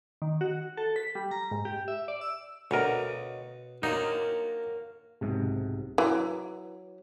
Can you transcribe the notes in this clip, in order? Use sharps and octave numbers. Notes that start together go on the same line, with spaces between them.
D#3
F#4
A4
B6
G3
A#5
G#2
G4
E5
D5
E6
D2 B2 A#4 C#5 D#5 F#5
F#3 D4 D#4 A#4 C5 C#5 F5
B1 G#2 C3
E3 F#3